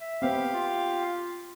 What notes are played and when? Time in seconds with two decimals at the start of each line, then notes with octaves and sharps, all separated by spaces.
0.01 E5
0.22 B3 C4 G4 F5
0.54 F4